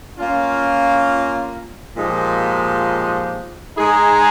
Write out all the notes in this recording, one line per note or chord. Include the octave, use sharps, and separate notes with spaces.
A#3 C#4 F4
A#2 F3 G#3 D#4 G4
G#3 D#4 G#4